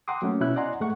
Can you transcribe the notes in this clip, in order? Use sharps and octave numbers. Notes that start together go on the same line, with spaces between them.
F#5 G5 A#5 C6 D6 D#6
F#3 A3 A#3 C#4
B2 C#4 E4 F#6
D5 D#5 F#5 G#5 A#5 C6
G#2 G#3 A3 F#5 C#6